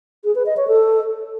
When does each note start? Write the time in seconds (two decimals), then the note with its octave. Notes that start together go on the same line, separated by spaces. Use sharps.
0.24 G#4
0.35 B4
0.46 D#5
0.57 C#5
0.68 A4